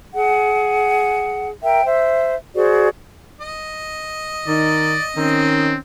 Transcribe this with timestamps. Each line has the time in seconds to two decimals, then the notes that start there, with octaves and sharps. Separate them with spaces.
0.14 G#4 F#5
1.63 A#4 E5 G5
1.85 C5 E5
2.55 F#4 G#4 C5 D5
3.40 D#5
4.47 D#3 D#4 D5
5.16 D#3 C4 C#4